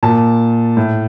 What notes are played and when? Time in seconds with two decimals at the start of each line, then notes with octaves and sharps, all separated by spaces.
0.03 A#2 A5
0.77 A2